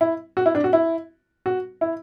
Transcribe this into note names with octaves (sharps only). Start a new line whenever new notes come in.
E4
F#4
E4
D4
F#4
E4
F#4
E4